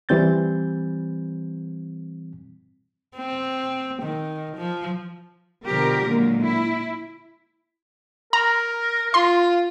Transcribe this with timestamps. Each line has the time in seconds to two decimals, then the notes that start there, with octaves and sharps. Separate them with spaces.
0.09 E3 G3 C4 G6 A6
3.17 C4
4.02 D#3
4.56 F3
5.64 B2 D3 F3 G3 G4 A#4
6.07 A#2 D3 F#3 G#3 A#3
6.41 E4
8.33 A#4 A#5
9.14 F4 C6